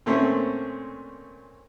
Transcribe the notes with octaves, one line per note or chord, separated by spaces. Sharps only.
A#2 A3 C4 C#4